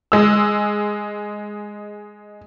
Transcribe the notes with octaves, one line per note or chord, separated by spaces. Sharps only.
G#3 E6